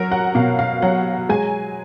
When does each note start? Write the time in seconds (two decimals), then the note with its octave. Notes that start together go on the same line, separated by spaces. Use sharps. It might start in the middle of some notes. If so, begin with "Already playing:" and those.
Already playing: F#3 F#4 A#4
0.12 F#5
0.35 B2 F5
0.59 F5
0.82 F#3 F#5
1.29 G#3 G#5